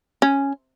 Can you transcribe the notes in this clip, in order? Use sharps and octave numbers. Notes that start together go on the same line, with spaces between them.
C#4